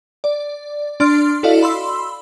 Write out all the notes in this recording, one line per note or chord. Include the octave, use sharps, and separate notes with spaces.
D5
D4 D5 C6 F6
E4 F#4 A4 D5 D#5 F5
B5 C6 E6